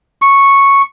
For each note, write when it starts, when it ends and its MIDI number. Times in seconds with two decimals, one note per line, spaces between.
0.22 0.82 85